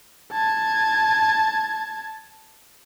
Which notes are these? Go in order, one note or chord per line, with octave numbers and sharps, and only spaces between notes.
A5 G#6